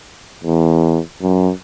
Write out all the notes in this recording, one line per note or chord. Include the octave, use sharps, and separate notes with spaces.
E2
F#2